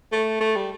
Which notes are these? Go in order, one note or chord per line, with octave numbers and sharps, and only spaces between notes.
A3
A3
G3